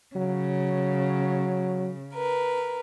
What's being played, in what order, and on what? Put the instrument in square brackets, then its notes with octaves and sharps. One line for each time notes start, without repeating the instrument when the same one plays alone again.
[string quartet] C#3 [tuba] F#3
[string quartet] A#4 B4